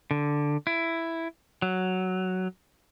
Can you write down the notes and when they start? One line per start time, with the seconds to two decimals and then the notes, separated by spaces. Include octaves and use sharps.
0.11 D3
0.67 E4
1.62 F#3